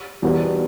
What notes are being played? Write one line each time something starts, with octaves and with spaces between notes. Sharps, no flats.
E2 B2 G3 B3